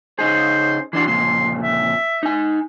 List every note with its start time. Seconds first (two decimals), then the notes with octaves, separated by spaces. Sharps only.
0.19 C#3 D#4 G#4 C5
0.93 E3 D4 F#4 C6
1.06 F2 A#2 C#3 C6
1.62 E5
2.23 D#4 G#5